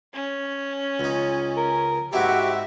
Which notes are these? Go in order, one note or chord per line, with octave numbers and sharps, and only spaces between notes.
C#4
C#2 D#4
A#4
G#2 C4 E4 F#4 G4 E5